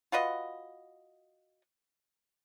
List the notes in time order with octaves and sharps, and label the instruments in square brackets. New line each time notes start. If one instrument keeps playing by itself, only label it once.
[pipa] F4 F#4 B4 D#5